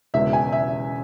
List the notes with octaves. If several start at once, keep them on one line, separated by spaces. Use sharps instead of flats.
E1 E2 C#3 G#3 B3 E5
G#5
E5